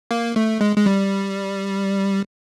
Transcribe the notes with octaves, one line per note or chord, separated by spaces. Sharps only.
A#3
A3
G#3
G#3
G3